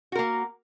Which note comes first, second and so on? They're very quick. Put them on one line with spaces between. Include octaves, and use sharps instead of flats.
F#4 A#4 A#3